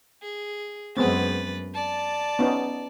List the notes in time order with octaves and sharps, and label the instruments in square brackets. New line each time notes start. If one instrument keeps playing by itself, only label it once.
[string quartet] G#4
[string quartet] F#2 B4 A6 [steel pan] G#3 B3 C4
[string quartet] D5 A5
[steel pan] B3 C#4 D#4